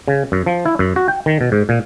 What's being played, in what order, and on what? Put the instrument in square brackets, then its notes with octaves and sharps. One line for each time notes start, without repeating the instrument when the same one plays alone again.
[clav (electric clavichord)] C#3
F#2
F3
E4
F#2
F#4
G5
D#3
B2
G#2
A#2